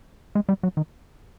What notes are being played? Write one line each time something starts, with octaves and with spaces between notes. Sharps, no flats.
G#3
G3
F#3
D#3